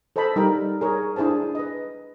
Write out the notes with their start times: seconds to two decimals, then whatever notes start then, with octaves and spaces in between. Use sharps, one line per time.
0.16 A4 C5 D#5 A5 B5
0.36 G3 D#4 A#4 G5
0.81 G#4 A#4 C#5
1.16 D4 E4 G#4 C5 A5
1.55 B4 D#5